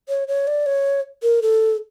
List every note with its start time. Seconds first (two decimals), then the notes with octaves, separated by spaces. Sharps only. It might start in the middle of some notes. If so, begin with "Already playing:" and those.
0.09 C#5
0.28 C#5
0.47 D5
0.66 C#5
1.23 A#4
1.42 A4